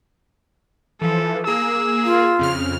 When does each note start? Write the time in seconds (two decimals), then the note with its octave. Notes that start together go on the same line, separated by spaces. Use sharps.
1.01 E3 F3 A4
1.47 A#3 G#4 E6
2.05 F4
2.39 F2 C#3 F6